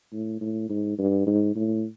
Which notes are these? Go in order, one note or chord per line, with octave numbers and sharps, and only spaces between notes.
A2
A2
G#2
G2
G#2
A2